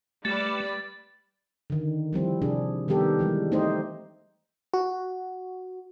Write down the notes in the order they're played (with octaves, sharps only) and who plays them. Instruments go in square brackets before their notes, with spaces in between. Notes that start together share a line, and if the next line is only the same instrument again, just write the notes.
[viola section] G3 B4 D5 [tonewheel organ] A3 [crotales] A6
[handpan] D3 D#3
F3 G3 C4 E4
C3 D4 G#4
D#3 G3 B3 G4 A4 A#4
E3 G3 G#3
A3 C4 D#4 G4 C5 D#5
[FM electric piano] F#4